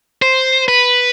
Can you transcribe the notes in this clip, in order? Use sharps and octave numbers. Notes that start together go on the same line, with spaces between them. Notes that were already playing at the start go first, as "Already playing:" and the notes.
C5
B4